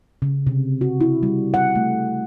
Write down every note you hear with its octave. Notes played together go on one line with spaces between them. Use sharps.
C#3
C3
F#4
E4
G3
F#5
A3